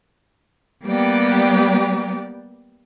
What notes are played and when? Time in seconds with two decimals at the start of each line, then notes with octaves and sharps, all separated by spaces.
0.83 G3 A#3 B3 G4 D5